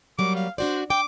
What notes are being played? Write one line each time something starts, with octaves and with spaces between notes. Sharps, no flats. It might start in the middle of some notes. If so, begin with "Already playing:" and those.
F#3 G3 A#3 D6
F5
D4 F#4 C5 D5
G5 D6